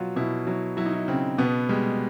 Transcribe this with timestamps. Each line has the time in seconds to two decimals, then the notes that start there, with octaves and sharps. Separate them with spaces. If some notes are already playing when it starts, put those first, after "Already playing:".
Already playing: B2 F#3 F4 F#4
0.16 B2 E4
0.47 F#3 E4
0.77 F#3 E4
0.86 D#4
0.93 E4
1.08 C#3 C4
1.38 B2 B3
1.69 G3 G#3